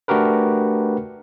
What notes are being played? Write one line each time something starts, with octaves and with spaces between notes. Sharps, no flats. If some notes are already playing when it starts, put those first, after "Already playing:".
A3 D4 F#4 G4 A#4 B4